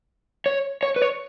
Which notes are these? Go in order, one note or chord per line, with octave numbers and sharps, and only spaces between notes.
C#5
C#5
B4
C#5